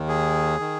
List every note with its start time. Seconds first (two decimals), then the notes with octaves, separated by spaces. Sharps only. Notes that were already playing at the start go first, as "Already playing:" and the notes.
Already playing: D#2 D#3
0.08 G#4
0.60 D#3